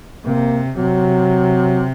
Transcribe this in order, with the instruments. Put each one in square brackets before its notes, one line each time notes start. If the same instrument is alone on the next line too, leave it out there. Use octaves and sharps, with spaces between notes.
[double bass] C3 [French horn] A#3
[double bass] C3 [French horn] F#3